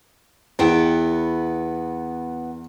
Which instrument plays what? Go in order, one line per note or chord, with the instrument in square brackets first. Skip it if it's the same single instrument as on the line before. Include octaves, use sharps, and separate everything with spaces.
[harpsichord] E2 [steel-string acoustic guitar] B3 E4 G5